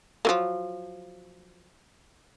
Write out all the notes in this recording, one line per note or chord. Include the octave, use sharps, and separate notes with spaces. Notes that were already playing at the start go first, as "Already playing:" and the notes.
F3 F#3 A#3